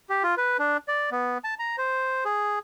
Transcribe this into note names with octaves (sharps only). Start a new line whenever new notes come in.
G4
F4
B4
D4
D5
B3
A5
A#5
C5
G#4